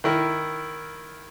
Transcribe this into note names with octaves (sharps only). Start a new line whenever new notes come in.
D#3 E4 A#4